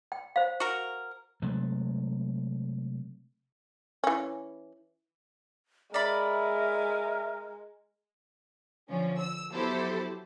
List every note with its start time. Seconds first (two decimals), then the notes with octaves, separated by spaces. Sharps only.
0.12 G5
0.36 C5 F5
0.60 F#4 A#4
1.42 C3 F#3 G#3 A3
4.04 E3 C#4
5.94 G#3 A#4 D5 E5 B5
8.89 D3 F3 C#4
9.19 E6
9.52 F#3 B3 E4 G4 A4 C5